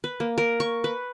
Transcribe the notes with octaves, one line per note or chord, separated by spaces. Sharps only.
B4
A#3
A#4
C#6
B4